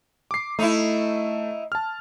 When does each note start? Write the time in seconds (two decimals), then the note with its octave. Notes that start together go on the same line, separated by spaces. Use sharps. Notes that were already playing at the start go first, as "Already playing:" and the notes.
0.31 D6 C7
0.59 A3 D#4 E4
1.72 A5 F6